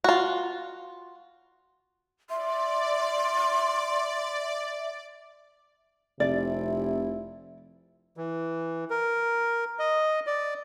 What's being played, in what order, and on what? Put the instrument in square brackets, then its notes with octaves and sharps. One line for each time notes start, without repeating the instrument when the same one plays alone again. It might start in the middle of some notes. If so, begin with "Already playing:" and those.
[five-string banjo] F4 F#4
[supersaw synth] D5 [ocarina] E5 [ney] C6
[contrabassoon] F1 [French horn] C3 [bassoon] E4 [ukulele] D5
[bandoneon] E3
A#4
D#5
D5